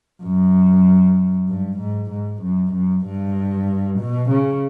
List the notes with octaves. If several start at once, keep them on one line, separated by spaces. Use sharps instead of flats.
F#2
G2
G#2
G#2
F#2
F#2
G2
B2
C#3